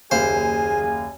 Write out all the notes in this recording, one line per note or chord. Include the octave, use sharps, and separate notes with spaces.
F#1 D#2 G#4 C5 F5 G#5